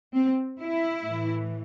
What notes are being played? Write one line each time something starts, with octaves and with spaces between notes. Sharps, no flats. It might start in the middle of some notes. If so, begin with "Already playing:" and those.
C4
E4
A2 E3